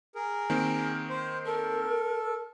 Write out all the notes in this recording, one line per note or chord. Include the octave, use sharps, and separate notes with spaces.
G#4 A#4
D#3 A#3 C4
C5
A4 A#4